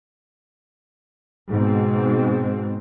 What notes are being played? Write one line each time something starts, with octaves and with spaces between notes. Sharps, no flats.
G#2 B2 C4